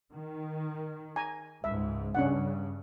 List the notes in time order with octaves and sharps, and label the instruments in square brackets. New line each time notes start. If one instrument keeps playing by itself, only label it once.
[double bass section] D#3
[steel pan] G#5 A#5
[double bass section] C#2 G#2 [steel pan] E5
[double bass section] G2 C#3 [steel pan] C#4 D4 F#5